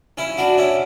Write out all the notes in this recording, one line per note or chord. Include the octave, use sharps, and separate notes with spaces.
C#4 E4
D4 F#4
C#4 E4